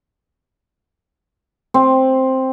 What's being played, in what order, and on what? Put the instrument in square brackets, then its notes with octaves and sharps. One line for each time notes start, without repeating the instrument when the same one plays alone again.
[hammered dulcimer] C4